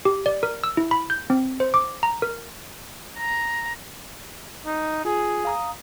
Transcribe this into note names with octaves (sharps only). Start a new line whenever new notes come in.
G4
D5
A#4
E6
E4
B5
G6
C4
C5
D6
A#5
A#4
A#5
D#4
F4 G#4
F5 A#5 D#6